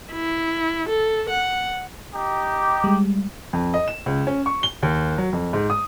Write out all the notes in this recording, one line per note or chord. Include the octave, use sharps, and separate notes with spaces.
E4
A4
F#5
D#4 G4
G3 G#3
F2
D#5
E7
C#2
C#4
C#6
G7
D#2
F#3
F2
G#2
D#6